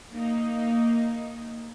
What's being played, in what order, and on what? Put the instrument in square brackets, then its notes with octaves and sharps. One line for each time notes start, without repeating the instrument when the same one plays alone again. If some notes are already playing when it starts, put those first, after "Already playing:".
[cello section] A#3 D#4